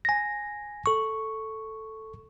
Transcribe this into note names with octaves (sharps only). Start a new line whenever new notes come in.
G#5 A#6
A4 C#6